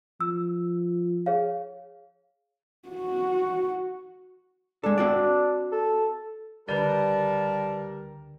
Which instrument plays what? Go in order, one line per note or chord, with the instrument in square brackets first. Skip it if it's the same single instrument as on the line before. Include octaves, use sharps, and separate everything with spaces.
[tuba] F3 [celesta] E6
[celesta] G#4 C#5 F5
[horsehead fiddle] F#4
[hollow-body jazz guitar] G#3 A4 [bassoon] D4
[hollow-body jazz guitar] C4 F#4 D5
[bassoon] A4
[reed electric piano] C#2 D3 [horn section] G3 A#4 [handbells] B4 D5 [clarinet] A5